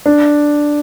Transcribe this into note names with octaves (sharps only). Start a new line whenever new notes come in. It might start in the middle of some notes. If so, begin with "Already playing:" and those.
D4